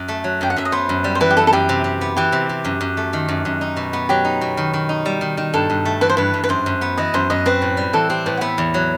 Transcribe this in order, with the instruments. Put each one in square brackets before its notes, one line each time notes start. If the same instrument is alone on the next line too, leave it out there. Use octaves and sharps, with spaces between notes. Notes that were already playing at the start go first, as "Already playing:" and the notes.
Already playing: [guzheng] F#2
A3
F#3
[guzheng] F#2 [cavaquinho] G5
[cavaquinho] F#5
[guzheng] F#2 [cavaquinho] E5
[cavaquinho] D#5
[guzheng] B3 [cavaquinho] C5
[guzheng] F#2
G3
[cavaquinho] C5
[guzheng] E3 [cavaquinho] B4
[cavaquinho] G4
[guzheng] B3 [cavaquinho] A4
[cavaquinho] A4
[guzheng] F#2 [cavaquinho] G4
[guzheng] C3
C3
B3
[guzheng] E3 [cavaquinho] G4
[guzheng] C3
C3
F#2
F#2
A3
D#3
F#2
F#2
D#4
B2
B3
[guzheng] F#3 [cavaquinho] G4
[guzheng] D#4
B2
D#3
D#3
D#4
G3
D#3
D#3
[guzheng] G2 [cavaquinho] A4
[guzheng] G2
A3
[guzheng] E3 [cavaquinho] B4
[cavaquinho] C5
[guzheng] G2 [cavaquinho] B4
[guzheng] G2
[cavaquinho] B4
[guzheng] F#2 [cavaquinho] C5
[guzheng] F#2
B3
[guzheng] E3 [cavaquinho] D#5
[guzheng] F#2 [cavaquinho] C5
[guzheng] F#2 [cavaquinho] D#5
[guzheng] C4 [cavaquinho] B4
[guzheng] A2
G3
[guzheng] E3 [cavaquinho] A4
[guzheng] C4 [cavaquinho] G4
[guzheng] A2 [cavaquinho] B4
[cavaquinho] F#5
[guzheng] B3 [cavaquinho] E5
[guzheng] E2
F#3